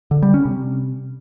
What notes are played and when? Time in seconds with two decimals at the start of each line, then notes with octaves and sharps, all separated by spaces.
0.11 D3
0.22 G3
0.34 C#4
0.45 C3